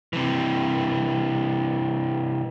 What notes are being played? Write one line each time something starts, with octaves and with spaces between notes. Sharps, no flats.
C3 E3